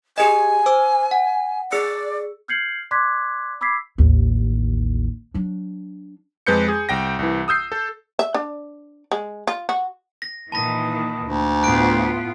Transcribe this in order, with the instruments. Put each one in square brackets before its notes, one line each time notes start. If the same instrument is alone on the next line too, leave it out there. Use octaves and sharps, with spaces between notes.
[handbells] G4 G#4 D#5 [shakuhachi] G#5
[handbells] C5 D6 E6
F#5
[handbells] G#4 E6 C#7 [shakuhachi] D5
[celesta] F6 G6 G#6 C7 C#7 F#7
D5 C6 D6 F#6 G#6 B6
B5 D6 E6 G#6 B6 C7
[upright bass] A1 D#2
F#3 D4
[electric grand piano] F2 G#3 B4 G6 C#7
G#4
C2 G5 A#6
C2 E3
D#6 E6 G6 C7
A4
[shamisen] E5
D4
G#3
F4
F#4
[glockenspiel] A#6
[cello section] A#2 D#3 E3 [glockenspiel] A5 B5 A#6
[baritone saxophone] D2
[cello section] A2 B3 F4 [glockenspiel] F#6 D7